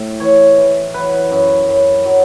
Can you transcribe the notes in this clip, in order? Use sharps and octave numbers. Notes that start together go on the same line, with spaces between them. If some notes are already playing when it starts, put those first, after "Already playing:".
Already playing: A2
E3 C#5
E3
F#3 B4
F#2
F#2
F#3